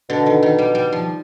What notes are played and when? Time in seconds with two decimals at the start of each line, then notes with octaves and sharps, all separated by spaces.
0.09 B2 D3
0.26 D#3
0.43 D#3
0.58 G3
0.75 G3
0.92 F3